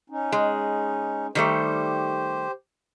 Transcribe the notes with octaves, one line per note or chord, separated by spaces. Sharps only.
C#4 D#4
G#3
D#3 G3 A3 G4 C5